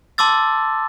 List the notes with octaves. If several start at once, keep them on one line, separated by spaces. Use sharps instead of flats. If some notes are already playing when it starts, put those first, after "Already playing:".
A5 C6 D6 E6 A6